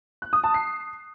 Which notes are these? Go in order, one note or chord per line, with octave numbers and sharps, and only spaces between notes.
F#6
D#6
A5
C7